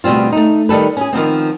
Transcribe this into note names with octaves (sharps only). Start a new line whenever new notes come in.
D2 B2 G3 C4 F4
A3 D#4
D#3 G3 A4 B4
C#4 G#4
D#3 F3 B3 C4